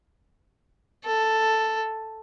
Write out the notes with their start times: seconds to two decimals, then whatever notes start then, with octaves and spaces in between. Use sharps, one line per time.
1.04 A4